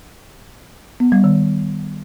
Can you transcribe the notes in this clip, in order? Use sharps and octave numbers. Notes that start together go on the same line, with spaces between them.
B3
G3
D#3